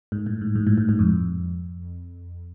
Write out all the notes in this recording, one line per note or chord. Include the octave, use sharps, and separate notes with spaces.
G#2
A2
G#2
G#2
A2
G#2
G#2
F2